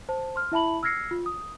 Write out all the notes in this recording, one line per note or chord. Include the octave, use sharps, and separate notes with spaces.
C5 A5
C6 F6
E4 E5 A5 B5 F#7
E6 F6 G#6 A#6 C7 C#7
F4
D#6